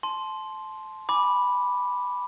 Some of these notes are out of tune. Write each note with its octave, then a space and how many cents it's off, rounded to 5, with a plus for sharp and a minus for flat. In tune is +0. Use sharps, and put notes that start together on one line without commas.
A5 -25 C6 +0
G#5 +0 B5 -5 D6 +0